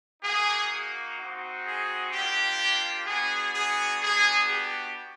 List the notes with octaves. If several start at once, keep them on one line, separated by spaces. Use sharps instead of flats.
A#3 D#4 F#4 G#4
C4 D#4 F#4
G#4
A#3 D4 F4 G4
B3 D4 F#4 G#4
G#4
B3 D4 F#4 G#4
G4